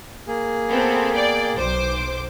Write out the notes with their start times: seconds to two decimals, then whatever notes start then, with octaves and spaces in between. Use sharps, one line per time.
0.27 A#3 G#4
0.69 B3 C4 A4
1.13 D5 G5
1.55 B1 C5 D6